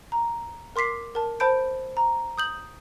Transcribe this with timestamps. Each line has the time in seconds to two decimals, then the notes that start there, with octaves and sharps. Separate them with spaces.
0.12 A#5
0.76 A#4 C6 D6 B6 C7
1.15 A#4 A5
1.40 C5 A5 B5 G6 D7
1.97 A#5
2.38 D#6 G6 F#7